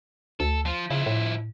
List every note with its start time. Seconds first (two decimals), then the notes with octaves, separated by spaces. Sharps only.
0.40 D2 A4
0.66 F3
0.91 C#3 F3 E4
1.06 A2